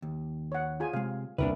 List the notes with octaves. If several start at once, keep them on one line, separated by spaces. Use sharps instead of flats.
D#2
C#5 F#5
F4 G#4 G#5
C3 G#3 F5
C2 A#3 D4 A#4 B4